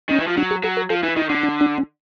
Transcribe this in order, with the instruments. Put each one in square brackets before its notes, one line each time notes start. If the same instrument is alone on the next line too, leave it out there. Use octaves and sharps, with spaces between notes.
[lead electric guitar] D#3 [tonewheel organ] C#4
[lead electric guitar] E3
F3
[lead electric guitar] F#3 [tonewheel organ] D4
[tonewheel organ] G#4
[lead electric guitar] F#3 [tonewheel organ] A4
[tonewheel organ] A#4
[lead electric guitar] F3 [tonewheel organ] A4
[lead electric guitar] E3 [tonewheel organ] E4
[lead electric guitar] D#3 [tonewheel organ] E4
[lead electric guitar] D3 [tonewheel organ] D4
[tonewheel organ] D4
D4
C#4